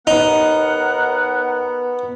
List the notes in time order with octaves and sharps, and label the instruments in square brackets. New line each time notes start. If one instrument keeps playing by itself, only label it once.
[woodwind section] D#2 A#4 F#5 [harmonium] B3 [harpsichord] D#4